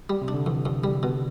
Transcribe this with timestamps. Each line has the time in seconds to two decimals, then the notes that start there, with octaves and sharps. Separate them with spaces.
0.10 G3
0.22 C3
0.28 D4
0.34 D3
0.46 F2 E3
0.65 F2
0.84 G3
1.03 B2